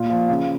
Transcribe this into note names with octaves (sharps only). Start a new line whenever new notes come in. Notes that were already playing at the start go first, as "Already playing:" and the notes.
Already playing: A#2 F4
F3
C#3